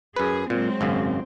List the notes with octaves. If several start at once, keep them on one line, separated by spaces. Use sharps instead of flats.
F#2 G#4 B4
A#2 F#3 G#3 C4
G#1 F#2 C#3